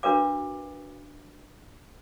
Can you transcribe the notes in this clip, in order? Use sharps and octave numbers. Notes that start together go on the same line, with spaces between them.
D4 F#4 A#4 B4 F5 D6